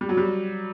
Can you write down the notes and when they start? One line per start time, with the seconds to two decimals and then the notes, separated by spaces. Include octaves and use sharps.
0.01 G3
0.09 F#3
0.17 G3